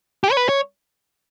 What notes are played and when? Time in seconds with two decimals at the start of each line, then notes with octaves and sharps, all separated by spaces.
0.24 G4
0.32 C#5
0.37 B4
0.49 C#5